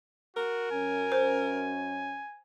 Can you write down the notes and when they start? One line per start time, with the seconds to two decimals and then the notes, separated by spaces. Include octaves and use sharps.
0.37 F#4 A#4
0.71 F#2 C#4 G#5
1.12 C5